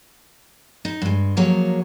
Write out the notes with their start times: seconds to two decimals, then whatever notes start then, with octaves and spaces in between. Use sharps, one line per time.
0.85 D#4
1.02 G2 G#3
1.37 F3 F#3 A#3 G#4 C#5